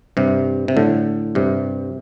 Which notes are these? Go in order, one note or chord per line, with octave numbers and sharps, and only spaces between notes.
G2 C3
C3
A2 D3
G2 C3